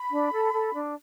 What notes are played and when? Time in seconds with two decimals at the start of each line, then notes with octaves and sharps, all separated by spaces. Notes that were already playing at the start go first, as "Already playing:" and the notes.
Already playing: B5
0.11 D4
0.33 A4
0.53 A4
0.74 D4